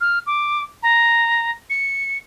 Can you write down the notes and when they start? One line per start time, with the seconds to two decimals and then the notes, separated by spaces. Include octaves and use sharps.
0.01 F6
0.27 D6
0.83 A#5
1.70 C#7